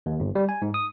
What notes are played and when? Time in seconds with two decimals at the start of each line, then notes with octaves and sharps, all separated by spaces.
0.06 D#2
0.20 G1
0.35 G3
0.49 G#5
0.62 G#2
0.74 D#6